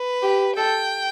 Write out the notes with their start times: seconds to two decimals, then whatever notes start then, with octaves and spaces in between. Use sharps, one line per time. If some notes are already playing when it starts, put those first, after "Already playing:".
Already playing: B4
0.22 G4
0.57 A4 G5